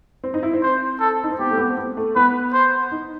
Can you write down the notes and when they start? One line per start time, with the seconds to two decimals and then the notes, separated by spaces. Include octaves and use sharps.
0.24 C4
0.34 D#4
0.43 E4
0.53 C4
0.62 C5
1.00 A4
1.24 D#4
1.32 C4
1.39 B3 G4
1.50 A3
1.58 B3
1.70 C4
1.77 B3
1.97 A3
2.16 B3 B4
2.53 C5
2.92 D#4